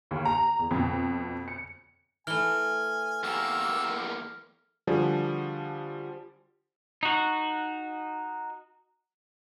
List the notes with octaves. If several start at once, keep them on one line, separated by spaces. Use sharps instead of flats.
D#2
A#5
E2
F2 B2
C#7
E3 A3 G#5 F6 G7
E2 A#3 G4 E6
D3 F3 G3 F#4 G#4
D#4 F#4